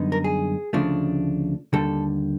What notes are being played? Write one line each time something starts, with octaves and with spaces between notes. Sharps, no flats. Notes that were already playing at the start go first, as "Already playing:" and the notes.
Already playing: F#2 D3 G3 B3 D#4
A#4
G#4
D2 C#3 F3 A3 D4
D#2 D3 G3 A4